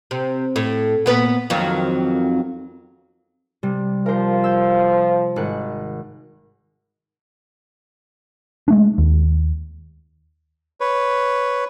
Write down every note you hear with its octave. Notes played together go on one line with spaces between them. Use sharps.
C3
A2
A#2 B3 B4
F2 D#3 F#3
C3 G3
F3 A#4 C5
E6 G6
G#1 D#3 F#5
G#3 A3 D4
D#2
B4 C#5